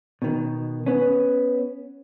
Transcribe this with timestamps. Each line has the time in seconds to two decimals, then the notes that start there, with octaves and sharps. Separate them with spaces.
0.22 B2 D#3
0.86 B3 C#4